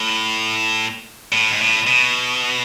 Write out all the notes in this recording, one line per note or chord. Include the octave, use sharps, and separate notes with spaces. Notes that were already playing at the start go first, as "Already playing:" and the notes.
Already playing: A2
A2
G#2
A2
B2